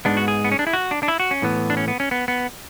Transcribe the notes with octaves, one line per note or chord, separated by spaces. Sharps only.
G#2 G#3 B3 D4
F#4
G#4
B3
C#4
D4
E4
F#4
D4
D4
E4
F#4
C#4
A2 E3 B3
D4
C#4
B3
C#4
B3
B3